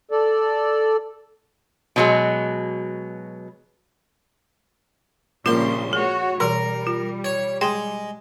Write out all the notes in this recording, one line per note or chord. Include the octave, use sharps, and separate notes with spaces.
A4 D5
B2 F#3 G#3
A#1 A#2 C#3 G3 F4 A#4 C6
F#4 G#4 C#5
B2 E3 G3 A#4
F4
C#5
G#3 G5 C6